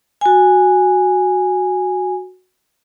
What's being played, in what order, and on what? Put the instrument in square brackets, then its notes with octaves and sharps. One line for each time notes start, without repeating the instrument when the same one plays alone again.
[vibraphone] F#4 G#5